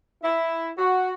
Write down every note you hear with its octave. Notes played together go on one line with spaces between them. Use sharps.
E4
F#4